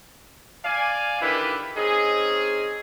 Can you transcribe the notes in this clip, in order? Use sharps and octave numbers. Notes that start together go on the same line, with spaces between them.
D5 F5 G#5
D3 D#3 D4 E4 G4 B4
C4 C#4 D#4 G#4